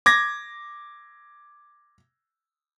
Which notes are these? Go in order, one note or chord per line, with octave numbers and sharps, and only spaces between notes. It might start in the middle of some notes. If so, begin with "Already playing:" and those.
D6 G#6 A#6